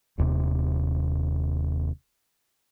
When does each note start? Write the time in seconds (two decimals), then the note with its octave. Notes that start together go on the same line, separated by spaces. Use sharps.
0.18 D#1 D#2 C3